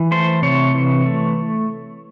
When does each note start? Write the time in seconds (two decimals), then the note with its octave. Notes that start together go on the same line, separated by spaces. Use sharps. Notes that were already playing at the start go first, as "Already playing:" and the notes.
Already playing: E3
0.11 A3 C5
0.42 C3 C#5
0.74 E3
1.06 A3